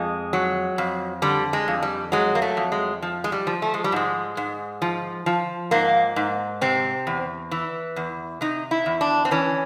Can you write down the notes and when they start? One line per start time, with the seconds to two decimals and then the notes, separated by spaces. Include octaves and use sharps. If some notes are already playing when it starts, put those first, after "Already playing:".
Already playing: F2 G#3
0.33 F#3
0.78 F2
1.22 D3 G3
1.53 G#3
1.68 F2
1.83 G3
2.12 F#3 G#3
2.35 A#3
2.42 A3
2.57 F2
2.72 G#3
3.02 F3
3.24 G#3
3.32 G3
3.47 F3
3.62 A3
3.74 G#3
3.84 G3
3.92 G#2 G#3
4.37 G#2
4.82 F3
5.26 F3
5.71 G#2 A#3
6.16 G#2
6.61 C3 C4
7.07 E2
7.51 E3
7.96 E2
8.41 C3 D#4
8.71 E4
8.86 E2
9.01 D4
9.25 C4
9.31 E3 C#4